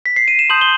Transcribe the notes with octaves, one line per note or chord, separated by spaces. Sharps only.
B6
C7
D#7
E7
A5 C6 D#6 G6 F#7
G7